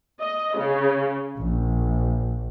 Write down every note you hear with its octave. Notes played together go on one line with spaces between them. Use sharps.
D#5
C#3
A#1